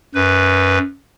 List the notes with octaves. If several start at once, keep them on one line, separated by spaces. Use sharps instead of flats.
F#2 B4